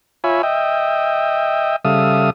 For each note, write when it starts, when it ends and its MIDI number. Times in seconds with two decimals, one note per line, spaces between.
0.24 0.42 65
0.24 0.42 73
0.24 0.42 76
0.24 0.42 80
0.24 0.42 83
0.43 1.76 75
0.43 1.76 76
0.43 1.76 79
1.85 2.30 49
1.85 2.30 55
1.85 2.30 69
1.85 2.30 76
1.85 2.30 77
1.85 2.30 87